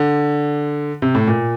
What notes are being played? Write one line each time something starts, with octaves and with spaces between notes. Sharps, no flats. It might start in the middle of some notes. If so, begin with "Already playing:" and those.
Already playing: D3
C3
A2
A#2